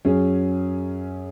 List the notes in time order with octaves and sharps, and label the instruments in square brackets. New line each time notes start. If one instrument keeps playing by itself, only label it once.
[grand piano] F#2 F#3 C#4 G#4